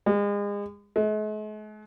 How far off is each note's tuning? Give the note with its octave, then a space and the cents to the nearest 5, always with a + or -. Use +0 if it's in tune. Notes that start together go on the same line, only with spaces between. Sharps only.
G#3 -35
G#3 +45